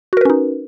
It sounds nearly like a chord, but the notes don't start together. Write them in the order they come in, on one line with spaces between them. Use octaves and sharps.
F#4 A#4 B4 C#4 D#4